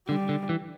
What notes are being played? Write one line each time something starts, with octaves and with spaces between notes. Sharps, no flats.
D3 G3
D3
E3